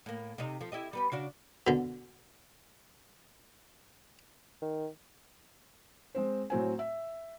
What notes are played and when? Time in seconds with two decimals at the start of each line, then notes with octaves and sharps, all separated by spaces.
0.06 A2 A#3
0.38 C3 D#4
0.61 F3 A3
0.72 E4 G4 D#5
0.93 G3 B3 G4
1.12 C#3 D4 F#4
1.67 B2 D3
4.62 D#3
6.15 G#3 C4 C5
6.50 A2 F#3 C4 G#5
6.79 E5